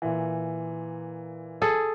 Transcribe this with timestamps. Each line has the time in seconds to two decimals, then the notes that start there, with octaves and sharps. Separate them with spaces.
0.02 A#2 E3
1.62 G#4 A4